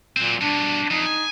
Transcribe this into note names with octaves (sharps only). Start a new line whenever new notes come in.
A#2 F#3 C4
G2 B2 D4
F2 D#4
G#5